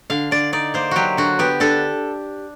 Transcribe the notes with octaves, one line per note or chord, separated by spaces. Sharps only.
D3 F5
D3 D5
D#4 D5
A#3 C5
F#3 F#4 G4
D3 F#4
B3 G4
D4 A4